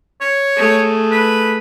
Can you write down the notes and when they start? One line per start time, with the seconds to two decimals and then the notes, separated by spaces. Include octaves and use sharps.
0.21 C#5
0.57 A3 G#4
1.12 B4